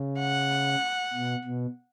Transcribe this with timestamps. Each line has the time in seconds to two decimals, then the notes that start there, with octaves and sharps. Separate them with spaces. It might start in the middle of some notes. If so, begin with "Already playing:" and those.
Already playing: C#3
0.19 F#5
1.13 B2
1.44 B2